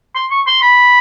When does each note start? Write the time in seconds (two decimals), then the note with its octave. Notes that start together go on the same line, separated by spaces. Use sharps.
0.15 C6
0.31 C#6
0.47 C6
0.62 B5